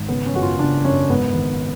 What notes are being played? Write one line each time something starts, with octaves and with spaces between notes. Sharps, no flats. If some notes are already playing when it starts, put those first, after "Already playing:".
Already playing: G#1 G#2
C#3 B3
C#4
F#2 F#4
F4
F#1 D4
F#2 C#4
G#2 B3
G#1